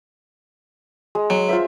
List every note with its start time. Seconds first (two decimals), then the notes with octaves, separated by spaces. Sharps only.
1.15 G#3
1.30 F#3
1.49 F4 C5 E5